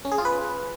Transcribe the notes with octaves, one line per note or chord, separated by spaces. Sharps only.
C#4
G#4
F4
B4